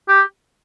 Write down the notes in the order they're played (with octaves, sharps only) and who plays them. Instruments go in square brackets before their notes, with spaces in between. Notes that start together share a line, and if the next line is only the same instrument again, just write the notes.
[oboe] G4